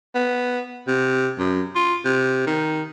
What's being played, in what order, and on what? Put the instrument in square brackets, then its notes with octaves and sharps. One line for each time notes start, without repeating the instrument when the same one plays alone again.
[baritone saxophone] B3
C3
F#2
F4
C3
D#3